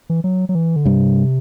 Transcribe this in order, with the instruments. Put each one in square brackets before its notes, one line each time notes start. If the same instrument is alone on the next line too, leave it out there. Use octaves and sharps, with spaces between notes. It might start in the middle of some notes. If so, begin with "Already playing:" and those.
[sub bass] E3
F#3
F#3
E3
D3
[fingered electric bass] G2 G3 [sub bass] C3